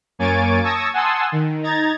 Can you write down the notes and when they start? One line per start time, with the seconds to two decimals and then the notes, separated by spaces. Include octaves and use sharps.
0.19 F#2 A#3 C#5 G#5 A6 D7
0.64 A5 C#6 D#6 E6 G#6 A#6
0.94 F#5 G#5 A5 C6 D#6 E6
1.32 D#3
1.63 D#4 A#5 G#6 A6